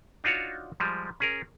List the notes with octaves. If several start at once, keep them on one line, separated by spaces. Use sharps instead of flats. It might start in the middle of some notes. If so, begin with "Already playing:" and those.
D4 D#4 F4 F#4 C#5
F3 G3 G#3
C#4 G#4 A#4